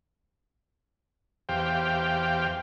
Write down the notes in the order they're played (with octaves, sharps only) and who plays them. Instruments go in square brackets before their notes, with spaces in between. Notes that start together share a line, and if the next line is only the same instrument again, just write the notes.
[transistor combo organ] E2 G4 C5 F5 G5